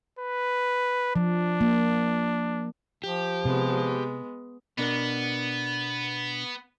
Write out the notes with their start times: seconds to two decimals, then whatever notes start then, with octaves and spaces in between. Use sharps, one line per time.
0.19 B4
1.16 F3 D4
1.61 A#3
3.04 F3 G4
3.45 C3 G#3 B3
4.78 B2 B3 D4 A#4